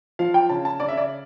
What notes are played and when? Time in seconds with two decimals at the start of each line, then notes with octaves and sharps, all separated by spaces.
0.19 F3 F5
0.34 G5
0.49 C#3 A5
0.65 A5
0.80 C#3 D5
0.88 E5
0.97 D5